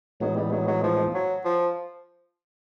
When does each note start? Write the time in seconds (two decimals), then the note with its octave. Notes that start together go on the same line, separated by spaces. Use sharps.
0.20 A2 E3 F#3 G#3 B3 D#4
0.36 G3
0.52 F#3
0.67 F#3
0.83 F3
1.14 F#3
1.45 F3